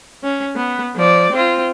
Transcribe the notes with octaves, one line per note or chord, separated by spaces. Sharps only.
C#4
B3
F3 D5
C4 F4